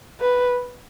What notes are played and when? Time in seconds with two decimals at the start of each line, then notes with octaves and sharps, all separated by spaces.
0.20 B4